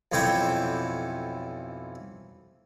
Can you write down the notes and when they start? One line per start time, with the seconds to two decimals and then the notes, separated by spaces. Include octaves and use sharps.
0.12 B1 F2 E3 C#5 G5 D6